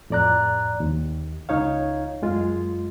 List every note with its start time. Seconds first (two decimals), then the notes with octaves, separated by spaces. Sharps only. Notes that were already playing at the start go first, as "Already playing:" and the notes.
0.10 F2 A2 D5 A#5 F#6
0.80 D#2
1.49 C#2 D#4 C#5 F5
2.22 F#2 G#3 F4